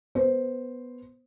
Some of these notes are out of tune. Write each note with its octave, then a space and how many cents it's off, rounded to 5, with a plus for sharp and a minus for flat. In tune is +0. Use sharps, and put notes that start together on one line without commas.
B3 +0 C5 +0